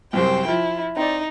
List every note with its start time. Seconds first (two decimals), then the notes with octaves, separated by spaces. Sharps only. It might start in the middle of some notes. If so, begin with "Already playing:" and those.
0.13 C2 F#2 C3 C5 G5
0.48 F3 E4
0.97 C4 D#4 D5